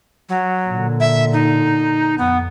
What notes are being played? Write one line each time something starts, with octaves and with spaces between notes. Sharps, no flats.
F#3
A#2 D3
E5
D#4
F2 B3